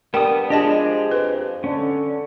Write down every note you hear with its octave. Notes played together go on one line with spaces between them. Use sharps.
G3 B3 D4 A#4 G5 D#6
F3 G#3 D4 G4 G#4 D#5 A5
F2 B4
D3 C#4